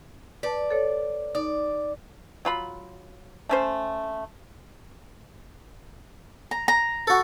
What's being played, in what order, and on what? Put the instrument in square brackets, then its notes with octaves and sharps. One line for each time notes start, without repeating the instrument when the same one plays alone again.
[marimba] B4 A5 [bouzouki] D5
[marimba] A4 C#5
[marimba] D#4 [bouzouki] D5
[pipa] F#3 F4 B5
A3 C#4 C5
[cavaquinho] A#5
A#5
[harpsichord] F#4 A4